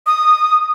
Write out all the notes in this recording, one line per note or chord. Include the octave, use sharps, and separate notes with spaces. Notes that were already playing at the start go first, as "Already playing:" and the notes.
D#6